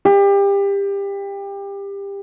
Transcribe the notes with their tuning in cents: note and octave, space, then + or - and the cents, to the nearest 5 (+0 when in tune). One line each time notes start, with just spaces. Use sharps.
G4 +25